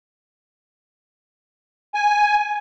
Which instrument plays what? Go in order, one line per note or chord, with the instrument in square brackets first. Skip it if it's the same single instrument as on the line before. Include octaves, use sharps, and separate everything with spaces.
[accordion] G#5